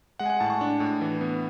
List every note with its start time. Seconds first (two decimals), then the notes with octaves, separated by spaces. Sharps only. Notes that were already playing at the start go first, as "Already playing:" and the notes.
0.19 G#3 F#5
0.26 G#5
0.30 F#5
0.40 A2 A5
0.50 C#6
0.61 D4
0.80 A2
1.01 E3
1.21 B3